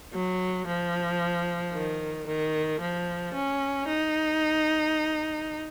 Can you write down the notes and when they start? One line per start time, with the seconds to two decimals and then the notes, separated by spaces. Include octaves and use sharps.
0.14 F#3
0.67 F3
1.73 D#3
2.26 D#3
2.81 F3
3.34 C#4
3.88 D#4